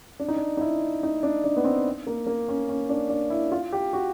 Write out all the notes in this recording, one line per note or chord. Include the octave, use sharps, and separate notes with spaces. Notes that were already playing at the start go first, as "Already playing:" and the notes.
D4
D#4
D4
D#4
E4
D#4
D4
D4
B3
C4
A#3
A#3
C#4
C#4
D4
D4
E4
F4
G4
F#4